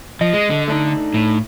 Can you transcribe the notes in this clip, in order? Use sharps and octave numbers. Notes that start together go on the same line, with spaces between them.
F3 D#5
G#3
D3
A3 D4 D#4
A2